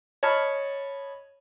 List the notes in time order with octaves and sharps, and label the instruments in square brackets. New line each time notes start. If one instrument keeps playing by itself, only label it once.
[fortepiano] C#5 D#5 A5 B5 F6